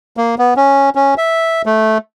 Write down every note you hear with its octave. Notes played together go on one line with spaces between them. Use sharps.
A#3
B3
C#4
C#4
E5
A3